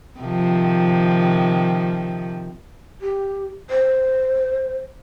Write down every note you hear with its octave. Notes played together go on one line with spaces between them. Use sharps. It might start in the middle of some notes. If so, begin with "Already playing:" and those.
C3 D#3 F3
G4
C5